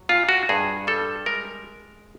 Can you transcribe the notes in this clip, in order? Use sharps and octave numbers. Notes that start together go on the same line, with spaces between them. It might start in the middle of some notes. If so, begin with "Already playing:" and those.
Already playing: F#3
A#2 F4
F#4
G2 G#4
G3 A4
G#3 A#4